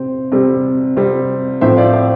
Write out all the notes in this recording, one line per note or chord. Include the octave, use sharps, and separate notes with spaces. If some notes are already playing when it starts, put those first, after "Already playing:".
Already playing: C3 C4
C3 G3 C4
C3 G3 C4
A2 F3 C4 C5 E5
D5 F5
C5 E5